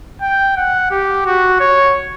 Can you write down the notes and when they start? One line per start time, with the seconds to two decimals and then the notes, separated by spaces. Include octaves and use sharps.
0.22 G5
0.57 F#5
0.91 G4
1.26 F#4
1.60 C#5